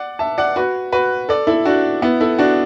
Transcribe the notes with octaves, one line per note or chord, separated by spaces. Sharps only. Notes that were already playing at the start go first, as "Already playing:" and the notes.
Already playing: D5 F#5
E5 A5
D5 F#5
F#4 B4
F#4 B4
A4 D5
E4 A4
D4 F#4
B3 E4
E4 A4
D4 F#4